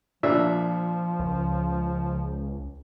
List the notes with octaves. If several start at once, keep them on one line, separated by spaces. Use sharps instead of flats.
A#2 F3 D4 E5
C#2